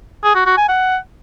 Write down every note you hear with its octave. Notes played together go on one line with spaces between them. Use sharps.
G#4
F#4
F#4
G#5
F#5